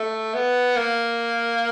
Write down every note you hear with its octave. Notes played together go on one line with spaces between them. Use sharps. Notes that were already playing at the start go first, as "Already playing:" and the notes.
Already playing: A3
B3
A#3